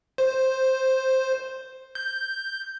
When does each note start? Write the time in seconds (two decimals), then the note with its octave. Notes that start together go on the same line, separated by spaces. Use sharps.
0.18 C5
1.95 G6